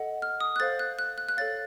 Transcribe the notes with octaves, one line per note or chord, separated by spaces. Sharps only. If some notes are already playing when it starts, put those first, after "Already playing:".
Already playing: A4 D#5 F#5
F6
D#6
F#6
A4 C5 F5 A6
F#6
F#6
F#6
F#6
A4 C#5 F5 A6